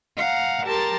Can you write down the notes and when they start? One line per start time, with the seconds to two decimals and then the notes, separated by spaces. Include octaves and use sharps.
0.19 F5 F#5 A#5
0.67 G4 A#4 A5 A#5 C6 A6